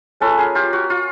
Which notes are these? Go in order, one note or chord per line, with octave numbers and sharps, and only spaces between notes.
G#3 C#4 F4 A4 B4
G#4 A#4
F4 G4
F#4
F4